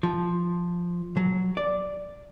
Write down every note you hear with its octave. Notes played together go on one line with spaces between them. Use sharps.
F3
F#3
D5